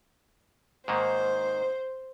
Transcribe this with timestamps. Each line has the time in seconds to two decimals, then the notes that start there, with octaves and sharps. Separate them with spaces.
0.88 G#2 D#3 A#3 C5